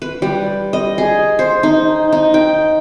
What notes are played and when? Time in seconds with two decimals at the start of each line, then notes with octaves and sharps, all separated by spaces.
0.02 B4
0.22 G3
0.73 D#5
0.98 G#4
1.39 C5
1.63 D#4
2.13 D#4
2.34 G5